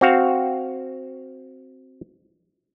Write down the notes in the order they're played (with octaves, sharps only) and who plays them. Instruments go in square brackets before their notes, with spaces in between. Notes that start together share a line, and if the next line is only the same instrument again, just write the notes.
[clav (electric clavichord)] C4 F#4 F5